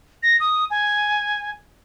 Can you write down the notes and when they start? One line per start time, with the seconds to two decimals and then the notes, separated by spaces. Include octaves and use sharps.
0.23 A#6
0.40 D#6
0.71 G#5